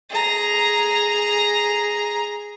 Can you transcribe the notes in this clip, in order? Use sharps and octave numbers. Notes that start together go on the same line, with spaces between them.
G#4 A#5